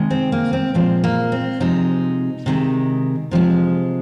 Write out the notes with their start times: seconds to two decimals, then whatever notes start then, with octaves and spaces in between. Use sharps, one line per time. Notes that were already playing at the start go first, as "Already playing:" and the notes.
Already playing: C3 D#3 G#3
0.10 C4
0.32 A#3
0.53 C4
0.74 A#2 F3 G#3 C4
1.04 A#3
1.32 C4
1.60 C3 F3 G#3 D#4
2.46 C3 D#3 G#3
3.31 C3 F3 G#3